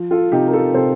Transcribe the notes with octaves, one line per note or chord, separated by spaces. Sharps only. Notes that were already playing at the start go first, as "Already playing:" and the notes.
Already playing: F3
F4 A4
C3 D#4 G4
A#4
F4 A4
C3 A4 C5